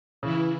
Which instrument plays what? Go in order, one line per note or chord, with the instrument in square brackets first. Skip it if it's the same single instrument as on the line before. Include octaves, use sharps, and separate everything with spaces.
[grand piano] C#3 [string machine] E3 E4